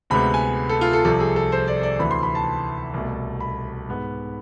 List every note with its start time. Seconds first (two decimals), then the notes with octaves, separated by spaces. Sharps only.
0.10 D2 C3 G#3 B3 B5
0.34 G#5
0.69 A4
0.81 F4
0.93 A4
1.05 C2 C3 F3 A4
1.20 G#4
1.36 A4
1.52 C5
1.68 D5
1.83 D5
1.99 D2 C3 E3 B5
2.11 C6
2.23 B5
2.35 A5
2.94 C2 B2 A3
3.40 B5
3.89 G#2 G#3 B3